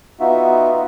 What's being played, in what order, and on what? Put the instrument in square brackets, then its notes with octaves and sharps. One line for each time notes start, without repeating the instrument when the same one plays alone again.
[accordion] B3 D#4 F4 F#4 E5